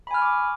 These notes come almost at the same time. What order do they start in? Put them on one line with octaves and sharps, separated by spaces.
B5 G#5 F6 C#6 D6